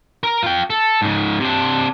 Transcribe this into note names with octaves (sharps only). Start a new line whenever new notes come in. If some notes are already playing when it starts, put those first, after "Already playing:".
A#4
F4 G5
A4
G#2 C#3
C3 D4